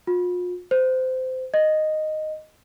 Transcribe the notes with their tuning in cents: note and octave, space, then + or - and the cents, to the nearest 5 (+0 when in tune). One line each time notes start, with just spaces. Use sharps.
F4 +40
C5 -20
D#5 -5